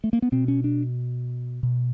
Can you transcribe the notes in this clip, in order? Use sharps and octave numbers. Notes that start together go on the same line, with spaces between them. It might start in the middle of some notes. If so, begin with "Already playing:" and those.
A3
A#3
B3
B2 C4
C#4
D4
B2